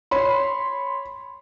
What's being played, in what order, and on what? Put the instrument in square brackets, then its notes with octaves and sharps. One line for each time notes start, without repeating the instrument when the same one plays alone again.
[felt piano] C#5 B5 C6